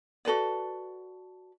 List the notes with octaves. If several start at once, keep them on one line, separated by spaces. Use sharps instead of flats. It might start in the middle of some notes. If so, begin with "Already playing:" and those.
F#4 A4 B4 D5